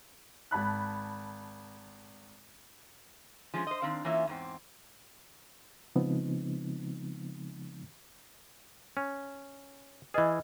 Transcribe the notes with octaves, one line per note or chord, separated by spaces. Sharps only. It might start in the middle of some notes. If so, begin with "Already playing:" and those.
G#1 A5 B5 F#6
F3 G#3 C#4
C5 D#5
D#3 C4 D4 F5
E3 A#3 C#4 F4 C#5 E5
E2 G#2 C4
C#3 F3 G#3 B3 C4 D#4
C#4
E3 G#4 B4 D#5